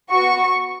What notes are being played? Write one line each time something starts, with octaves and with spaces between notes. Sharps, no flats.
B3 F#4 C#6